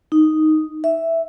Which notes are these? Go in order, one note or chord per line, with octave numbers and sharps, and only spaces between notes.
D#4
E5